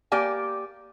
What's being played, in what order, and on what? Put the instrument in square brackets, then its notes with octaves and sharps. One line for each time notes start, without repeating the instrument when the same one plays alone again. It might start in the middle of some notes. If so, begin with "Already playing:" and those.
[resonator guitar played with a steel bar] A#3 G4 D5 G5 G#5